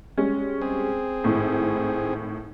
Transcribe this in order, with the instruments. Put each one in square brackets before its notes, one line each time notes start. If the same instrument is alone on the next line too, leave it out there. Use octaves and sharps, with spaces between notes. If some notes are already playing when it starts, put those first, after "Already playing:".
[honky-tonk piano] G3 G#3 C#4
[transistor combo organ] C4 G#4
[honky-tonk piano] G#1 A2